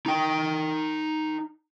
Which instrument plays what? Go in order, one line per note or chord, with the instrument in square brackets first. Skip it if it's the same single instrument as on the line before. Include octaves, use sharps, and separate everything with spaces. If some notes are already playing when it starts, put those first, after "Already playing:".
[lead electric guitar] D#4 G5